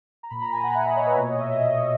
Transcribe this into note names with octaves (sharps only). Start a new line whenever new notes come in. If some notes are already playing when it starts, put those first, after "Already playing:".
A#5
A#2 B5
A#2 A#5
G#5
A#2 F#5
A#2 E5
A#2 D#5
C#5
A#2 B4
B2 C#5
B2 D#5
E5
B2 D#5
B2
B2